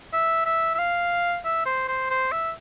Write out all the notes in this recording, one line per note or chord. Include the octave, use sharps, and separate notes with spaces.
E5
E5
E5
F5
E5
C5
C5
C5
E5